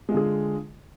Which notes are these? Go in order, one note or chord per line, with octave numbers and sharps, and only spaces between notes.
D3 G#3 F4 G#4